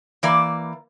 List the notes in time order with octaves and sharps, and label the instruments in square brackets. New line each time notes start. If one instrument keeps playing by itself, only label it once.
[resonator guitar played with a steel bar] E3 A#3 D5